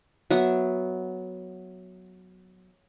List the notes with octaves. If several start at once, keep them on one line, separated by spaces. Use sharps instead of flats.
F#3 B3 E5